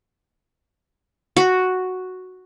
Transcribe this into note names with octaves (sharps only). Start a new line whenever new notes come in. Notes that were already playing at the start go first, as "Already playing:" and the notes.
F#4